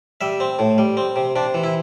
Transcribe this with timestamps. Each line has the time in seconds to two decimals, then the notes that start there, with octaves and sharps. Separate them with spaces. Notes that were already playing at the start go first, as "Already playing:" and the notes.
0.21 G3 E5
0.40 C4
0.59 A2
0.78 G3
0.97 C4
1.16 C3
1.36 C3 D4
1.54 E3
1.64 E4